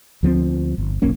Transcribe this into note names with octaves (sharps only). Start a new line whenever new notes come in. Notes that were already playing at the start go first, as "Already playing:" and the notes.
D2 F3 G3 C4
G1
F1 B1 A#3 C#4